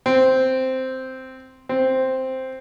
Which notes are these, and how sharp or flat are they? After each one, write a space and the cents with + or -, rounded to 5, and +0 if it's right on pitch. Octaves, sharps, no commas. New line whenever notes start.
C4 -5
C4 +0